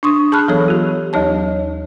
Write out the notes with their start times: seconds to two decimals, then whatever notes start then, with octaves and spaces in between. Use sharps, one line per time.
0.03 D4 C6 C#6 D#6
0.32 G#4 A5 B5 F6 F#6
0.48 E3 F#3 B3 G#4 A4 C#5
0.68 F4 G4
1.13 D#2 F#3 D#4 C#5 A5